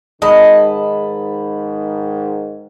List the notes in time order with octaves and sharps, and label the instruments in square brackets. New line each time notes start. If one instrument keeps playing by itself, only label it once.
[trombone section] G#2 D#3 [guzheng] G#3 [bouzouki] D#5 [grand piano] A5 B5